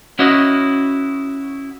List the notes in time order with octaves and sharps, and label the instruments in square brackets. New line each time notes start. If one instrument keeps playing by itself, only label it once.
[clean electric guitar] C#4 E4 F#4 B4 D#5 F#5